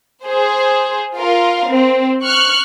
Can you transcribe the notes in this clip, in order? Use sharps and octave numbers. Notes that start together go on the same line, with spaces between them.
G#4 C5
F4 A#4 F5
C4
C#6 F6 F#6